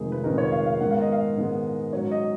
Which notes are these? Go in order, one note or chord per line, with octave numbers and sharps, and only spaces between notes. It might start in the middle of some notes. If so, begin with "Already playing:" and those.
Already playing: F1 F2 D#3 G#3 D#4 G#4
B4
F1 F2 D#3 G#3 D#4 A#4
C#5
F5
F5
G#2 D#3 G#3 B3 F#5
F5
D#5
F5
G#2 D#3 G#3 B3
G#2 F#3 C#4 C#5
D#5